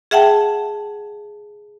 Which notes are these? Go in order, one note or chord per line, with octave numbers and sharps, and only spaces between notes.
G#4 E5 F#5 G5 A5